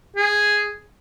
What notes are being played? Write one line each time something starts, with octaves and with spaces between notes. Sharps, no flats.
G#4